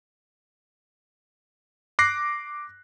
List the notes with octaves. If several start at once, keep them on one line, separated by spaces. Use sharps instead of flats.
D6 F#6 A#6 C7